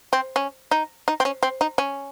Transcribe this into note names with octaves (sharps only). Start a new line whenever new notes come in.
C4
C#4
D#4
D#4
C4
C#4
C4
D#4
C#4